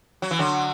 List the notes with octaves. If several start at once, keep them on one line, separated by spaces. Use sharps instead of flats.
F#3
E3
D3 F#3